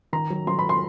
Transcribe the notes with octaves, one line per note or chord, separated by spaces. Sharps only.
D#3 A#5
F#3
F#3 C6
B5
C6